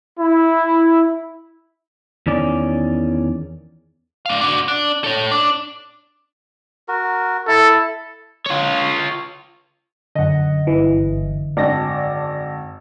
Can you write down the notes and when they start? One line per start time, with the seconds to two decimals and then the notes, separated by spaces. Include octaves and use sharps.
0.18 E4
2.27 E2 D#3 C#4 D5
4.26 D4 F5
4.41 D4 F#4
4.68 D4
5.04 A4 C#5
5.31 D4
6.88 F#4 A#4
7.48 E4 A4
8.46 F4 C#5
10.15 F#2 D3 D#5 F#5
10.67 G1 E3
11.57 G#1 D4 D5 A#6